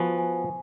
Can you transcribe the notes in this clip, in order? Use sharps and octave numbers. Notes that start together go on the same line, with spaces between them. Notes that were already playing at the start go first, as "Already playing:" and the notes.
Already playing: F3 B3 F#4 G#5
G#5